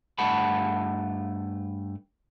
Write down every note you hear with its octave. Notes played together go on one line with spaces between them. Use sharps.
G2 A3 F#5 A5 B5